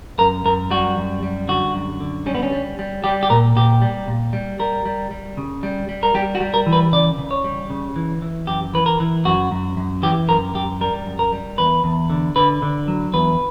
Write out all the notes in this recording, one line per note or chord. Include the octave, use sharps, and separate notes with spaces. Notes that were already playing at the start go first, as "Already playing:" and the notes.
F#2 A#4
F#2 A#4
G3 F#4
F#2
G3
D3 F#4
F#2
D3
G3 C#4
B3
C#4
G3
G3
G3 G4
G4
A#2 A#4
A#2 G4
G3
A#2
G3
G3 A#4
G3
G3
C#3
G3
G3
A#4
G3 G4
F#4
G3
A#4
E3
B4
C#3 D5
C#3
C#5
G3
C#3
E3
E3
F#2 G4
E3 B4
A#4
E3
F#2 F#4
F#2
F#2
E3 G4
F#2 A#4
F#2 G4
G3 A#4
F#2
A#4
G3
E2 B4
E2
D3
D3 B4
D3
F#3
E2 B4